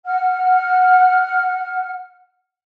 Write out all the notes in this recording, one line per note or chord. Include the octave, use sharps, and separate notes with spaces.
F#5 F6